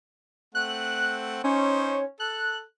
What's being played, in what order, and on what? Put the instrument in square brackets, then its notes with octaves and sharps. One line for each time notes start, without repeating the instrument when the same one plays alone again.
[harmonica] A3 C4 F#5 [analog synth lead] F#6
[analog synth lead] C#4 [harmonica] D#4 C5 C#5
[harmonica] A4 [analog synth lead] F#6